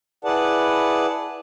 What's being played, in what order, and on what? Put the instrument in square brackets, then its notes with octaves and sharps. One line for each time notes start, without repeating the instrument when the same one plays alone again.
[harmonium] E4 G#4 B4 D5 F#5 A5